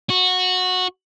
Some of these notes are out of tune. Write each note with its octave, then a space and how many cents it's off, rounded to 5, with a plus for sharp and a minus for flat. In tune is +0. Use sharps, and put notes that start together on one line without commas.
F#4 -15